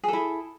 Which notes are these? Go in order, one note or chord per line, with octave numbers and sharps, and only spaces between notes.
E4 G#4 A4